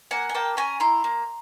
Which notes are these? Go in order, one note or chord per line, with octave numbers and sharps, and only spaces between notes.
A#3 F#5 G#5
G#5
A#3 G5 A5
C#4 G#5 A#5
E4 A#5 C6
A#3